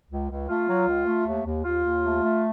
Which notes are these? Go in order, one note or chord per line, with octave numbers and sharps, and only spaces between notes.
C#2
C#2
A3 F4
F#3
C#2
A3
D#2
D#2
D#2 F4
D#2
A3
A3